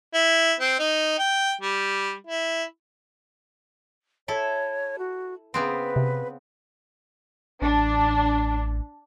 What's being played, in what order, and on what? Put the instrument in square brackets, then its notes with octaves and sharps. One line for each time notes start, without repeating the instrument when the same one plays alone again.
[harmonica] E4
C4
D#4
G5
G3
E4
[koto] E4 A4 E5 [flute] C#5
[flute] F#4
[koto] C#3 B3 C4 [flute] B4
[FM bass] C3
[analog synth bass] A1 [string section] D4